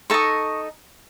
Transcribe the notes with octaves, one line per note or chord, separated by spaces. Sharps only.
D#4 A4 D#5 C#6